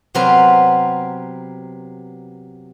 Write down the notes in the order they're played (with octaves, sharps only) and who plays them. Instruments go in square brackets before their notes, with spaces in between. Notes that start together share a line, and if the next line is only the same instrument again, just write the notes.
[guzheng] C3 F#3 B3 C4 A#4 B4